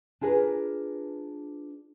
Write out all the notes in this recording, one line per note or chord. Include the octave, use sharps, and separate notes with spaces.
D4 F4 G#4 A#4 B4